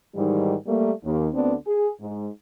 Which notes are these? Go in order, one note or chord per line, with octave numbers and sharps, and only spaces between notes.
G#2 D#3 E3 G3
G3 A3 A#3
D#2
D2 D3 B3 C4 D4
G#4
G#2